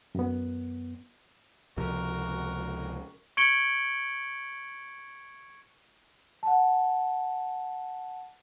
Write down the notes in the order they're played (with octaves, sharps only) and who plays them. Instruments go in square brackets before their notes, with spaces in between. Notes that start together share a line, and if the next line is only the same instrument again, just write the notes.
[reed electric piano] F#2 B3
[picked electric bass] C#2 C3 F3 [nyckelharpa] F#4 A#4
[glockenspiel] C#6 G#6 C#7 D7 F#7 G7
[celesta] F#5 A5